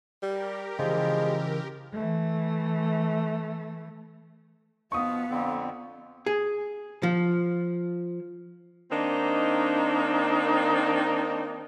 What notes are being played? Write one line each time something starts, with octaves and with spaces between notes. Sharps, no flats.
G3 G4 A#4
C#3 E3 F3 G#3
E3 A3
B2 F3 B3 F5 C#6 D#6
F2 D3 C4
G#4
F3
D#3 A#3 C4 D4 D#4